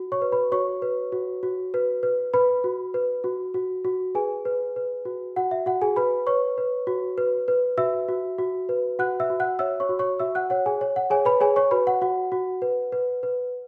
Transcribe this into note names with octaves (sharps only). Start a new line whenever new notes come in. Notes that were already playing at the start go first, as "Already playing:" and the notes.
Already playing: F#4
C#5 C#6
B4
B4 B5
F#4 C#5 C#6
B4
F#4
F#4
B4
B4
B4 B5
F#4
B4
F#4
F#4
F#4
G#4 B4 G#5
B4
B4
F#4
F#4 F#5
E5
F#4 F#5
G#4 G#5
B4 B5
B4 C#5 C#6
B4
F#4
B4
B4
F#4 E5 E6
F#4
F#4
B4
F#4 F#5 F#6
E5 E6
F#4
F#5 F#6
C#5 E5 E6
C#5 C#6
F#4
C#5 C#6
F#4 E5 E6
F#5 F#6
C#5 F#5
G#4 G#5
C#5
F#5
G#4 C#5 G#5
B4 B5
G#4 C#5 G#5
C#5 C#6
F#4 B4 B5
F#5
F#4 F#5
F#4
B4
B4
B4